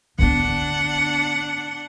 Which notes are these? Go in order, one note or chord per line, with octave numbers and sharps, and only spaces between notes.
D3 B3 D4 F#5